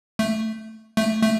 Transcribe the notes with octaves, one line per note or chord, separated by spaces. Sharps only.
A3
A3
A3